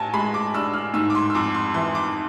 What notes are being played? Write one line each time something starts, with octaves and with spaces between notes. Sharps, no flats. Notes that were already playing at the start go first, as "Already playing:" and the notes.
Already playing: A1 G#5 A5
G#3 B5
D6
D4 E6
F6
G#2 E6
D6
C6
E6
F2 D6
C6
E3 C6
D6